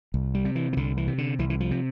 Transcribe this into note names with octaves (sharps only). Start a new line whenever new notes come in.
C2
G3
C3
E3
E3
C2 D3
E3
C3
D3
C2 E3
E3
F3
C3